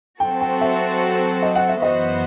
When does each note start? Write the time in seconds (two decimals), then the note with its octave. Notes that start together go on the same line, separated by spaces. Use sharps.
0.20 F#3 C4 F#4 A4 G5
0.41 G5
0.61 E5
1.42 D#5
1.55 F#5
1.69 E5
1.82 F#2 E3 B3 F#4 C5 D#5